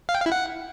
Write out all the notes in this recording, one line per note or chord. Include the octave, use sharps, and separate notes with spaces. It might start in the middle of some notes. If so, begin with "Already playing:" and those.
F5
G5
F5
E4
F#5